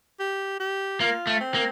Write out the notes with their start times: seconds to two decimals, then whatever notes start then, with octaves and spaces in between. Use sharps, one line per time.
0.20 G4
0.60 G4
1.00 A#3 F4
1.27 A3
1.40 C4
1.54 A#3